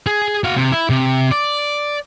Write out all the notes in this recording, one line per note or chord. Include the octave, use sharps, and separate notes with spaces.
G#4
F#4 F5
C3
E4
C3
D5